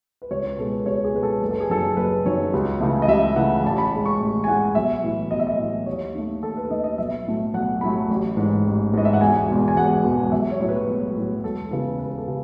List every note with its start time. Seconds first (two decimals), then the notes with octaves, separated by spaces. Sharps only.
0.22 B4
0.31 C#2 C#5
0.44 B4
0.58 B2 G#3 A4
0.72 B4
0.86 C#2 C#5
1.04 G#4
1.14 B2 G#3 B4
1.23 A4
1.42 F#1 B4
1.51 A4
1.60 G#4
1.70 F#2 D#3 F#3 A4
1.97 F#1 B4
2.25 F#2 D#3 F#3 C#5
2.54 C#2
2.80 C#3 E3 A3
3.02 D#5
3.08 C#2 E5
3.36 C#3 E3 A3 F#5
3.64 A1 A5
3.78 B5
3.92 A2 G#3
4.06 C#6
4.20 A1
4.44 G#5
4.47 A2 G#3 F#5
4.75 B1 E5
5.04 A2 E3
5.31 B1 D#5
5.39 E5
5.47 D#5
5.59 A2 E3
5.86 D#2 C#5
6.15 D#3 A3
6.43 D#2 A4
6.57 B4
6.70 D#3 A3 D#5
6.84 D#5
6.98 B1 E5
7.27 A2 F#3 A3
7.54 B1 F#5
7.81 A2 F#3 A3 B5
8.09 A1
8.37 G#2 E3
8.66 A1
8.93 G#2 E3 D#5
9.05 E5
9.13 F#5
9.21 E1 G#5
9.49 E2 B2 G#3
9.68 G#5
9.76 E1 F#5
10.04 E2 B2 G#3
10.32 B1 E5
10.51 C#5
10.60 A2 F#3
10.69 B4
10.87 B1
11.16 A2 F#3
11.43 E1 A4
11.71 E2 C#3 E3 B4
11.99 E1 B4
12.10 B4
12.18 A4
12.28 C#3